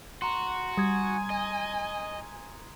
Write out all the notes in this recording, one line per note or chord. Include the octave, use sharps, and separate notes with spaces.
F#4 A#5 C6
G3 G#5 D#6 G#6
D#5